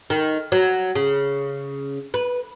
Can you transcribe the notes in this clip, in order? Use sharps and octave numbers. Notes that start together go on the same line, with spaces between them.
D#3
F#3
C#3
B4